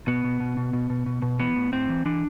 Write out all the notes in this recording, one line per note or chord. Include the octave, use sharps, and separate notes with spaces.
B2 B3
B2
B2
B2
B2
B2
B2
B2
E3 B3
A2
A2 C4
E3
E3 D4